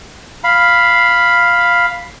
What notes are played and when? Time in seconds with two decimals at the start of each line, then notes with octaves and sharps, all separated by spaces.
0.44 F5 B5